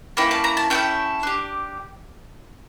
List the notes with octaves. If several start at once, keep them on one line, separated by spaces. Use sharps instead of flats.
A#3 C#4 E4 G5
A5
A#5
A5
C#4 E4 A4 G5
D4 G4